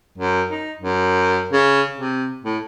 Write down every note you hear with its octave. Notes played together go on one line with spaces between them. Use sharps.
F#2
D#4
F#2
C#3
C3
A2